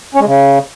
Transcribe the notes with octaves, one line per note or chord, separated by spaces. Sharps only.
C#4
G#3
C#3